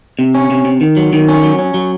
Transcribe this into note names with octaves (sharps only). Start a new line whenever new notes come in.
C3
C#4
C3
C3
D#3
F#3
D#3
C#4
F#3
C#4
F#3